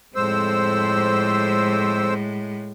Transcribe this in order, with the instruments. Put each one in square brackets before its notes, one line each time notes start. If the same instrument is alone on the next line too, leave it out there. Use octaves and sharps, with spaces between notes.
[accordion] F2 C5 E6 [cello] A2 G#3